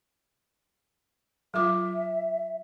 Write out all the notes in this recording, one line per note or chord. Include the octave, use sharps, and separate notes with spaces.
F#3 F4 E5 D6